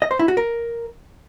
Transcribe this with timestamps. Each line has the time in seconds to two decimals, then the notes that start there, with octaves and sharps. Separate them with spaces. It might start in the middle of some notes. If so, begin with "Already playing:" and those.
0.02 D#5
0.11 C5
0.19 E4
0.28 F#4
0.37 A#4